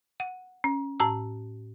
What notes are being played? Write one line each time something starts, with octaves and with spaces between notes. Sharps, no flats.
F#5
C#4
A2 A5 E6